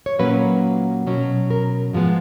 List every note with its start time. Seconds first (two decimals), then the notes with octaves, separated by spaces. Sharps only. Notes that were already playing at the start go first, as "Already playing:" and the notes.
0.06 C#5
0.19 A#2 F#3 A#3 C#4 B4
1.07 B2 F#3 C#4
1.51 A#4
1.93 G#2 F3 G#3 B3